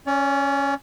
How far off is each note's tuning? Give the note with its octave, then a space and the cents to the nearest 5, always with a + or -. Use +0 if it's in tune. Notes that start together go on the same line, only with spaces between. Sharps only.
C#4 +0 D5 -40